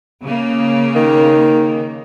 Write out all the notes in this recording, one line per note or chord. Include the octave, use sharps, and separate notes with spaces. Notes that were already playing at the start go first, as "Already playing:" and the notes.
C#3 A#3
D#3